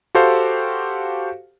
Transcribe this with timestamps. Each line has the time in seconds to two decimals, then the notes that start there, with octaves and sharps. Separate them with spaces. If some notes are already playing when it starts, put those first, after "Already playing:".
0.15 F#4 G4 A4 C5 F5